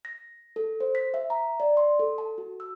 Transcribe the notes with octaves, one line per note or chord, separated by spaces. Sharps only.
A#6
A4
C5
B6
E5
A#5
D5
C6
A4
A5
F#4
E6